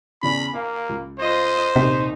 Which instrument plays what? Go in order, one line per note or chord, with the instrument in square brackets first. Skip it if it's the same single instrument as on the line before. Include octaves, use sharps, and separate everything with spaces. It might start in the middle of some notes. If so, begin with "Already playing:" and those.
[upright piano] E2 C#3 D5 [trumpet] B5
[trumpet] A#3 [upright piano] F5
[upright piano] C#2
[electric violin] F4 D#5 [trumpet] C5
[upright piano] A#1 D#2 B6 [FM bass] C3 [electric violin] D#4